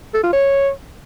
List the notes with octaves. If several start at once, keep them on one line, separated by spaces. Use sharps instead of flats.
A4
F4
C#5